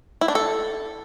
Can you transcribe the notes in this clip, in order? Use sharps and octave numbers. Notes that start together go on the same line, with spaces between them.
E4
D4
A4